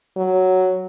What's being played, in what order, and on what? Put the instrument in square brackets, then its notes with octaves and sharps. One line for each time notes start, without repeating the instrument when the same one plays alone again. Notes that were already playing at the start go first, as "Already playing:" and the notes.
[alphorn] F#3